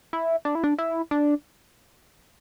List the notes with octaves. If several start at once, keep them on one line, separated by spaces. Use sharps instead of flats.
E4
D4
E4
D4
E4
D4